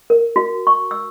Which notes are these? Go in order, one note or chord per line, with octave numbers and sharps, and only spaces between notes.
A#4
F#4
C#6
E6